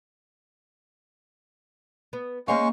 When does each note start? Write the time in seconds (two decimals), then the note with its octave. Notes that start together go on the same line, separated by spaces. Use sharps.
2.13 B3
2.48 G#3 A#3 C#4 C5 F5 C#6